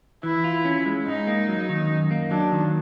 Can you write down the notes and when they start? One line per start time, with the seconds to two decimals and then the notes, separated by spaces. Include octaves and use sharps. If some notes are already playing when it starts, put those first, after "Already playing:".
0.23 E3 E4
0.44 F4
0.65 C#4
0.86 G#3
1.07 G#2 D#4
1.27 A#3
1.48 F#3
1.69 D#3
1.90 F#2
2.11 A#3
2.31 F#3 D4
2.52 D#3